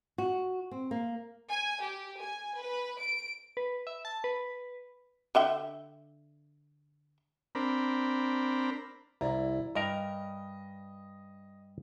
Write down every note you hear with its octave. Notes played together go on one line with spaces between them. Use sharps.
F#4
C4
A#3
G#5
G4
G#5
B4
D7
B4
E5
A5
B4
D3 E5 G5
C4 D4 A#4 B5
C2 E4 D5 A#5
G2 A#4 D#5